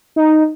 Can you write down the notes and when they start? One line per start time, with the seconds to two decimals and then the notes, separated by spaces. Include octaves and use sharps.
0.16 D#4